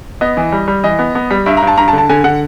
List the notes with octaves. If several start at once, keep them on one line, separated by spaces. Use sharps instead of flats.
B3 D#5
E3
G3
G3
E3 D#5
B3
B3
G3
G2 E5
A#5
G2
A5
G2 A#5
A5
D3
A5
D3 G#5
D3 F#5